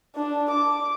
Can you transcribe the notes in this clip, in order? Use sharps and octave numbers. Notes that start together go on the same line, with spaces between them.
D4
D6